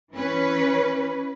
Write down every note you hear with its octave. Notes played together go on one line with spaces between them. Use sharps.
E3 C#4 B4